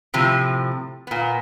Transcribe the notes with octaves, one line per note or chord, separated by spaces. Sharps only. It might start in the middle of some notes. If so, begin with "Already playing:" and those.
A2 C3 F3
A#2 B3